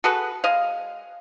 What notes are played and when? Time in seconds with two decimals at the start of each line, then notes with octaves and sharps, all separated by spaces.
0.04 F#4 G#4 A4 B4
0.44 G#3 D#5 F5